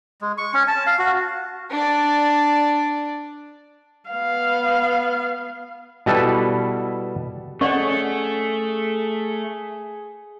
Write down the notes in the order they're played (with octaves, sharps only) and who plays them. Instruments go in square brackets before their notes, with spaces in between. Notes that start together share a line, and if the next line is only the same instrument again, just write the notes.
[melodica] G#3
C#6
C#4
A5
F5
F#4
[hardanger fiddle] D4 D5
[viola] B3 F5
[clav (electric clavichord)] B2 G3 E4 A4 B4
[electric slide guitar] A3 [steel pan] C#4 F#5 [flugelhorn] G#4 [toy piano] D5 D#5 C#6